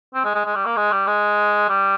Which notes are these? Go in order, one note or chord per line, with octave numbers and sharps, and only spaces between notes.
C4
G#3
G#3
G#3
G3
A#3
G#3
G3
G#3
G3